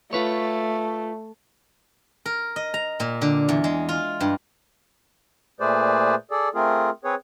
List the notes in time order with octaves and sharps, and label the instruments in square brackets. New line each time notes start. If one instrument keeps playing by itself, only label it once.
[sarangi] A3 [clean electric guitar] F4 B4 C#5
[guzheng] A#4
D#5
A#5
A#2
D3
E2
G#3
F4
G2
[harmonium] A#2 A3 G#4 B4 C5 D5
G#4 A4 D5
A3 C4 F4 G#4 A#4
C4 G#4 B4 C#5